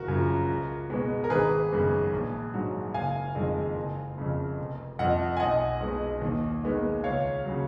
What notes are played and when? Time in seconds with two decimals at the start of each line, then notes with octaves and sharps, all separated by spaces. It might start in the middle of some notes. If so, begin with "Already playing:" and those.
Already playing: F#1 F#4 A#4
0.08 F#2 C#3 F3
0.49 C#2
0.90 B2 G#3 B3
1.24 A#4
1.30 G#1 G#4 B4
1.72 F#2 C#3 G#3 B3
2.13 A#1
2.54 G#2 F#3
2.94 F#1 F5 G#5
3.35 F2 D#3 G#3
3.76 F#1
4.18 F2 C#3
4.58 F1
4.99 F2 F3 D#5 F#5
5.37 G#5
5.40 B1 D#5 F#5
5.81 B2 G#3 B3
6.22 D#2
6.63 D#3 G#3 B3
7.04 C#2 C#5 F5
7.45 C#3 F#3